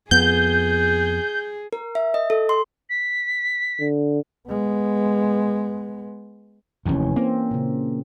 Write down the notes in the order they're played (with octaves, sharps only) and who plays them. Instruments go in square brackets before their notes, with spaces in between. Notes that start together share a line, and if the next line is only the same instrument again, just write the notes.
[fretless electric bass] F2 B3 [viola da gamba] G#4 [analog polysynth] G6
[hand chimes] A#4
E5
D#5
A4
C6
[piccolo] B6
[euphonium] D3
[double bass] G#3 B3
[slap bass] F1 D#2 [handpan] E3 C#4
[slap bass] A#3 [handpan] C4
[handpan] A#2 C#3